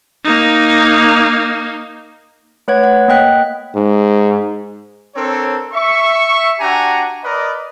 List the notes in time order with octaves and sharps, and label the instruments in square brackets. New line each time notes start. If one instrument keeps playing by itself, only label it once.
[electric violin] A#3 D#4
[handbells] A3 B4 C#5 F#5 G#6
C#5 F#5
A#3 D#5 G5 F#6 B6
[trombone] G#2
[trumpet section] C4 D4 A4 A#4 C#5
E5 C#6
D4 F#4 G4 F#5 G#5 A#5
A#4 B4 D5 D#5